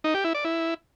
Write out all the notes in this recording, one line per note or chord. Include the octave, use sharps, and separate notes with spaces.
D#4
G4
E4
D5
E4